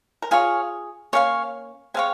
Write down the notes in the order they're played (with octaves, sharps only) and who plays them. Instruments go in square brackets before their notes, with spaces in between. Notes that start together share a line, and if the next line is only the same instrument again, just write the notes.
[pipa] A#4
[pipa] F4 G#4 [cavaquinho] C#5 F5 G#5
[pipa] A#3 C#4 [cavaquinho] C#5 F5 G#5
[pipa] G#3 C4 [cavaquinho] C#5 F5 G#5